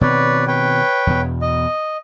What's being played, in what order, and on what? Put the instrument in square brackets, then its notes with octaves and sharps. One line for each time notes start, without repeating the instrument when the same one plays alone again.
[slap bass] B2 D#3 C4 [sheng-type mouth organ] B4 C#5 D5
[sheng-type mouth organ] B4 C#5 G5
[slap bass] E2 B2
[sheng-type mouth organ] D#5